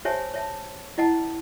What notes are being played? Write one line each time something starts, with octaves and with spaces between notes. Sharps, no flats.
G4 C5 C#5 E5 G#5 A5
C#5 E5 A5
E4 D#5 F#5 A5